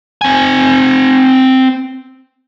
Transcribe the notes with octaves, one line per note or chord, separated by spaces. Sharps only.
C4 G#5